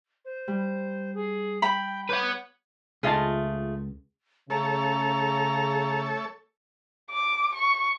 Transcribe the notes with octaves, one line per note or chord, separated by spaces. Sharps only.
C5
G3
G#4
G5 B5
B4 C#5 F#5 D6 F#6 G6
C#2 A3 F4 G#4 D#5 A5
C#3 A3 A4 C#5 A#5
D6
C#6